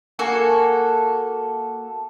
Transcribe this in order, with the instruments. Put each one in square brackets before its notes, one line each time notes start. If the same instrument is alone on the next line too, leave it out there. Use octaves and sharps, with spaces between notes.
[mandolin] A#3 F#4 A4 G#5